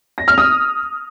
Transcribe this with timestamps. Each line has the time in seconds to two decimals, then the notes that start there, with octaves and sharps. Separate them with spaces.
0.18 A#6
0.28 F6
0.38 D#6